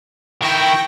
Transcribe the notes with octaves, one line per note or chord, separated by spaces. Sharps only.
D#3 E4 G5 C#6 A#6